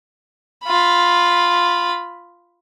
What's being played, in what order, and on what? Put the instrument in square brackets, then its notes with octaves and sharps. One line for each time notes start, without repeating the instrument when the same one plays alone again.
[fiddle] F4 B5